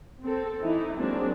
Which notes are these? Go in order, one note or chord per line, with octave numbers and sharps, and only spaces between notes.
C4 A4
E3 D#4 E4
F#3 G#3 A#3 C4 D4